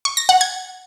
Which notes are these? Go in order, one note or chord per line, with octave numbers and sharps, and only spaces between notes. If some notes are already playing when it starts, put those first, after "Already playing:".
C#6
A#6
F#5
G#6